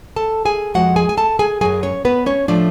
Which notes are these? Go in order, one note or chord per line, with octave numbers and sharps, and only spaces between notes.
A4 A5
G#4 G#5
F2 F3 G#3 F#4 F#5
G#4 G#5
G#5
A4 A5
G#4 G#5
F#2 C#3 F#3 G#4 G#5
C#4 C#5
B3 B4
C#4 C#5
A2 F3 A3 D4 D5